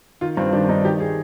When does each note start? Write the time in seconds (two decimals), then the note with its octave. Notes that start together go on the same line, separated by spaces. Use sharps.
0.21 D#3 F4
0.37 G2 C4
0.53 D#3 D4
0.69 G2 D#4
0.85 D#3 G4
1.00 G#4